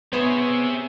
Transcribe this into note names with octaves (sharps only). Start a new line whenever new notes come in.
B3 C4 G#4 C5 C#5 E5